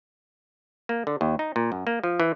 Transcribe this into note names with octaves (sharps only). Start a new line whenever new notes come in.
A#3
D3
D#2
D#4
A#2
F#2
A#3
F3
E3